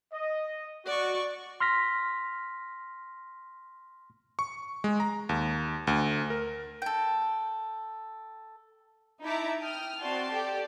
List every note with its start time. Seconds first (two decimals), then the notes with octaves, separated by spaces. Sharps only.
0.13 D#5
0.86 F#4 D5 C#6
1.60 C6 F6 A#6 B6
4.39 C#6
4.84 G#3
5.00 A#5
5.29 D#2
5.87 D2
6.30 A#4
6.82 A4 G5
9.22 D#4 E4 E5 A5 A#5 D6
9.60 G5 D#6 F6
9.99 C4 F#4 D5 A5 C6
10.31 G4 A4 D5